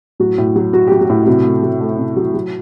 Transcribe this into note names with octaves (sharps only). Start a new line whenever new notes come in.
A2 F#3 F#4
A2
F#3
F#3 F#4
F#3 G4
F#3 F#4
A2
E4
C3 F#3 F#4
A3
F#3
A3
C3
F#3
F#3